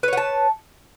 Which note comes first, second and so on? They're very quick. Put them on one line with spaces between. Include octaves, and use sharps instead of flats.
B4 C#5 F#5 A5